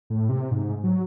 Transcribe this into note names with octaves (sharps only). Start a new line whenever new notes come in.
A2
C3
G#2
F#3